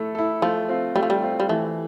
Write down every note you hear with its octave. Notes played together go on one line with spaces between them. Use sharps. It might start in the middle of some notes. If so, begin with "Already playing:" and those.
Already playing: A3 E4 A4
E4 A4
F3 A3
C4 F4
G3 A3
F3
G3
C4 F4
G3
E3 A3